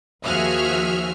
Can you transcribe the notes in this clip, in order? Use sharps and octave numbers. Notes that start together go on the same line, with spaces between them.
D#2 F3 F#4 G#4 E5 F6